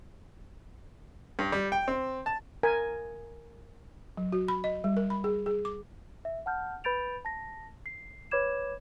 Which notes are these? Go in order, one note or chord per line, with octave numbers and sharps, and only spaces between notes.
G2
G3
G5
C4
A5
A#4 G#5
F#3
F#4
B5
D#5
G3
A#4
B5
G#4
G#4
D6
E5
F#5 A5 F6 G6
B4 B5 G6 A6 D7 F7
A5 A#6
C7
B4 C#5 B5 D6 G#6 E7